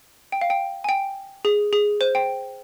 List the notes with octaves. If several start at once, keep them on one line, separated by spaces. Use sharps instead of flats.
G5
F5
G5
G#5
G5
G#4
G#4
C5
G5